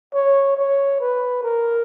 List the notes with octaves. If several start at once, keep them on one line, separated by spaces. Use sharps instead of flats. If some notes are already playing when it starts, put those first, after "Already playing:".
C#5
C#5
B4
A#4